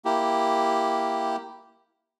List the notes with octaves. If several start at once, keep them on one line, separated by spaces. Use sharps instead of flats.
A#3 E4 G4